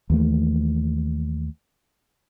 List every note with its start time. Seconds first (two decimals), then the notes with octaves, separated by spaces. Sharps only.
0.10 D#2 E3 A3